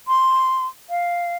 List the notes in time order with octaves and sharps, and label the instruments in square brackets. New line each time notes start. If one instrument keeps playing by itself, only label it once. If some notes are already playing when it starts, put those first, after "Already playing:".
[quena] C6
F5